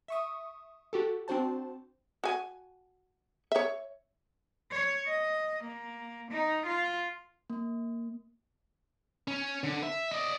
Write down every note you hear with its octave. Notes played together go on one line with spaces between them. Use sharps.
E5 C#6 D#6
F#4 G4 A4
C4 D4 F#4 C5 A5
F#4 G#5
C#5 E5
C#5
D#5
A#3
D#4
F4
A#3
C#4
D3
E5
D5 D#5